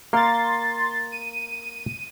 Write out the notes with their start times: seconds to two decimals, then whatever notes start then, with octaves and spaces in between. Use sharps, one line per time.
0.13 A#3 A#4 F5 C6 A6
1.12 D#7